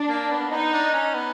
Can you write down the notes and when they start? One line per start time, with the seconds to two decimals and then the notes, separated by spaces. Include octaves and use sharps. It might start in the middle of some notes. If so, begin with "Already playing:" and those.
Already playing: D4
0.09 A#3
0.31 B3
0.51 B3 D#4
0.73 D4
0.93 C#4
1.15 B3